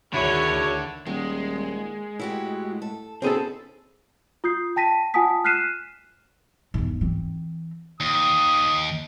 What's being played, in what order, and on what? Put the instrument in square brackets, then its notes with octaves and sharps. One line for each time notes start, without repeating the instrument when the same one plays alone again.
[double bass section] D2 D#3 [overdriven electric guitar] D3 [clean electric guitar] E4 F#4 G#4 [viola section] C#5
[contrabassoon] D#1 [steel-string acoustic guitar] D#3 [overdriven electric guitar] G#3
[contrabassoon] A2 [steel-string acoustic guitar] E4 F#4 G4
[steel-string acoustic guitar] A4
[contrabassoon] B2 [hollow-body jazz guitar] C4 G#4 A4 [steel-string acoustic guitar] C#4 D#4 E4
[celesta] F4 D#6 G6 C7
G5 A5 A#6 B6 D#7
F4 F#5 G#5 A5 D#6 B6
F6 F#6 B6 C7 D#7 E7
[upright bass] E2 G#2
E3 C4
[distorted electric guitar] D#2 [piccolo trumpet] D#6